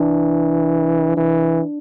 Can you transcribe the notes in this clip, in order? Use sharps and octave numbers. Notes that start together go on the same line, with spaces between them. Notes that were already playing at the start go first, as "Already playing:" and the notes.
Already playing: E3 D4
E3